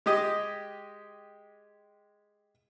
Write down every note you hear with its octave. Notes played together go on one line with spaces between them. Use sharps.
G#3 G4 D#5